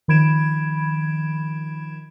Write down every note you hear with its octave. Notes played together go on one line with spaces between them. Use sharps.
D#3 F3 B5 G#6 D7 E7